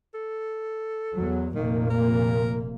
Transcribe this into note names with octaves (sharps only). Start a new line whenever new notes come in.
A4
E2 F#3
F1 A#2 D#3 A#3
A#4